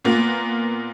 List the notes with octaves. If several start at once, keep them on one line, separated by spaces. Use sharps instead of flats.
A#2 A#3 B3